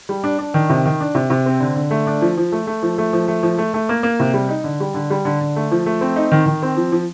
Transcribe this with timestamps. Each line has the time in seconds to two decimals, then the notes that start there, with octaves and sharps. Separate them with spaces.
0.09 G3
0.24 D4
0.39 D4
0.54 D#3
0.69 C3
0.85 D#3
1.01 D4
1.15 C3
1.30 C3
1.46 C4
1.60 D3
1.76 D3
1.91 A3
2.07 D4
2.22 F3
2.37 F3
2.52 A3
2.67 A3
2.83 F3
2.98 A3
3.13 F3
3.28 A3
3.43 F3
3.58 A3
3.74 A3
3.89 A#3
4.03 A#3
4.20 C3
4.34 G3
4.49 D#4
4.64 D3
4.80 G3
4.94 D3
5.10 G3
5.25 D3
5.41 D3
5.56 A3
5.71 F3
5.86 A3
6.01 C4
6.16 D#4
6.32 D#3
6.46 D#3
6.63 C4
6.77 F3
6.92 F3